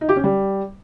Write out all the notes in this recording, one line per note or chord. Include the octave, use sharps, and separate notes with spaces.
D#4
G4
C#4
G3